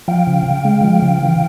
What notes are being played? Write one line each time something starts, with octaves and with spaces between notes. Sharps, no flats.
F3 F5 G5
C#3
C#3
G#3
F3
C#3
E3